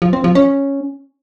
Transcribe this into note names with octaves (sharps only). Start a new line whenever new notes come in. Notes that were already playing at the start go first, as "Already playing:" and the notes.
F3
C4
F3
C#4